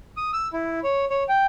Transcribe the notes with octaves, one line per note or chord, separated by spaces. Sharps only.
D#6
E6
E4
C#5
C#5
G5